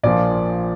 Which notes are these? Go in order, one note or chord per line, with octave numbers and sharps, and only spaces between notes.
A#1 A#2 F3 D5